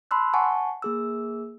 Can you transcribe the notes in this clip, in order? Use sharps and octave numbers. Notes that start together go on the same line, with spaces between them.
A5 B5 C6 E6 F#6
F#5 G#5 A5 C#6
A#3 G#4 E6